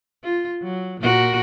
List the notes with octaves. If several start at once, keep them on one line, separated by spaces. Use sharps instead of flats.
F4
F#3
A#2 F#4 A#4